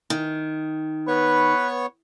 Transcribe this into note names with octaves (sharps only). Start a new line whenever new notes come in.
D#3
B3 B4 C#5 C#6